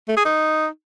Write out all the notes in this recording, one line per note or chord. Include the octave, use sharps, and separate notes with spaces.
A3
G#4
D#4